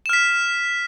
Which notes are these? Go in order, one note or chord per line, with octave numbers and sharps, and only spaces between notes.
F6 B6 E7